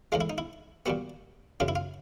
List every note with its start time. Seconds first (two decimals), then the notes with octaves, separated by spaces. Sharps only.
0.12 A2 E3 G#3 F4
0.21 E4
0.30 D#4
0.38 E4
0.86 A#2 G3 B3 F#4
1.60 F#2 C#3 F#3 F4
1.68 E4
1.75 F4